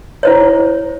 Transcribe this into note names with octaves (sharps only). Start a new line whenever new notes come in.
E4 C5 C#5